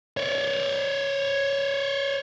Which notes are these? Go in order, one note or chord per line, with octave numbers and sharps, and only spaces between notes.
C#5 D5